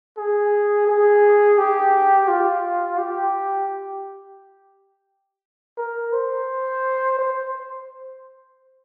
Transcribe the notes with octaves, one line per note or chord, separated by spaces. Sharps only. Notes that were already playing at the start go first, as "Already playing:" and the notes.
G#4
G#4
G4
F4
G4
A#4
C5
C5